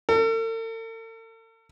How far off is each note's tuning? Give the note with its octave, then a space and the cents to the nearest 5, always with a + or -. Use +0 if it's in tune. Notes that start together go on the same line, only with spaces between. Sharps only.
A4 +45